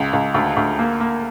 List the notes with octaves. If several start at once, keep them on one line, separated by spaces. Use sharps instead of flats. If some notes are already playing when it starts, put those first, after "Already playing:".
Already playing: C#2
C#2
D2
D2
A#3
A#3